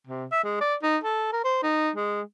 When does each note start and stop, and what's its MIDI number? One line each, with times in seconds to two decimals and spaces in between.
0.07 0.25 48
0.32 0.44 76
0.44 0.58 56
0.61 0.75 74
0.83 0.97 63
1.04 1.28 69
1.33 1.41 70
1.44 1.58 72
1.63 1.90 63
1.96 2.22 56